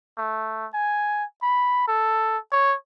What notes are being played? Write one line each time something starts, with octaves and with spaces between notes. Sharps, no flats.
A3
G#5
B5
A4
C#5